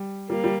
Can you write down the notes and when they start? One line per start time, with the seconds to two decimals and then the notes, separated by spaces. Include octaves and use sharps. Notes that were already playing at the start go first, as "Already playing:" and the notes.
Already playing: G3
0.30 G3 A#3
0.44 G3